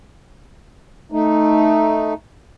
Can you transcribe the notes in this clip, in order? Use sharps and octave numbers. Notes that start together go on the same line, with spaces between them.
A3 D#4